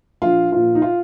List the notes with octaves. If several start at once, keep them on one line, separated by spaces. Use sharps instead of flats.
A#1 F4
A#2 F3 F4
D#4
F4